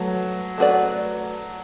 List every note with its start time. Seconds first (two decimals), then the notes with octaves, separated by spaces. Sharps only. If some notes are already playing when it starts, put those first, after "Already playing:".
Already playing: F#3 A3 B4
0.58 A3 F#4 B4 D5